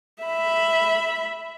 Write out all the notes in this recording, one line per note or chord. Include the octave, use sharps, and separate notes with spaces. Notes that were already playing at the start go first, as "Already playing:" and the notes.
E5 B5